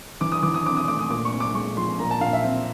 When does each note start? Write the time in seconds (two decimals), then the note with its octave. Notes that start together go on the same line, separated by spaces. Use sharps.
0.21 E3 D6
0.32 D#6
0.43 E3 D6
0.54 D#6
0.65 C4 D6
0.77 D#6
0.88 A3 D6
0.99 D#6
1.10 A#2 D6
1.25 C#6
1.32 C4
1.40 D6
1.54 G#3 C#6
1.77 F3 C6
1.99 A#2 A#5
2.11 A5
2.21 A#2 F5
2.33 E5
2.44 C4